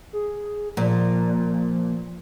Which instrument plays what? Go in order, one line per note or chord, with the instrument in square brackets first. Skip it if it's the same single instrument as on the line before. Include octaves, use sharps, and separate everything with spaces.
[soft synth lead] G#4
[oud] A#2 [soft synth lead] F3